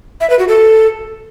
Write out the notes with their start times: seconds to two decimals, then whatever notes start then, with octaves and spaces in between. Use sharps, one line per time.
0.21 E5
0.30 B4
0.39 F#4
0.48 A4